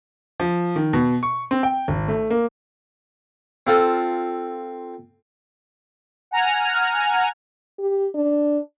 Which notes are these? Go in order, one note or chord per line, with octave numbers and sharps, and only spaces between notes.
F3
D#3
B2
C#6
C4
G5
G#1
A3
A#3
C4 F4 A4
F#5 G#5 A#5 F6
G4
D4